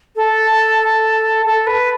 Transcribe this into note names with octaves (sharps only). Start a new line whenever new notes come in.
A4
A4
B4